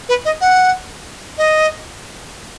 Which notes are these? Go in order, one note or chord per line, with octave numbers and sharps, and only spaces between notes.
B4
D#5
F#5
D#5